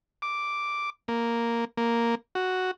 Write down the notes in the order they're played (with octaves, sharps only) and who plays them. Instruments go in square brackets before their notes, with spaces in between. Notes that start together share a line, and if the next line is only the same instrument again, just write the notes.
[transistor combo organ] D6
A#3
A#3
F#4